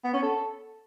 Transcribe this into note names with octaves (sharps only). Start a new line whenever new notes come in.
B3
C#4
A4